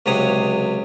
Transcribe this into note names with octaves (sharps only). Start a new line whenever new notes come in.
C#2 C3 F#3 C#5 D#6